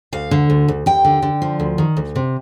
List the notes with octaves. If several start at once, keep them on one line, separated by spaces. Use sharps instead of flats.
D2 F5
D3
D2
D2
D#2 G5
D3
D3
F3
D2
D#3
D2
C3